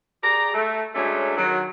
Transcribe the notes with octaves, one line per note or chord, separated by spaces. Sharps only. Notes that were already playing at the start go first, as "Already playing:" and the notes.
G4 G#4 D5 A#5
A3
F#3 G#3 A3 C#4 D4
D#3 F#3